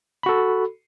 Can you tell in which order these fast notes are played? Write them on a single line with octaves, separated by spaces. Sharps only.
B5 F#4 A4